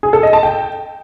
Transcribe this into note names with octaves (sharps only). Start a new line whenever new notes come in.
G#4
A4
D#5
A5
G5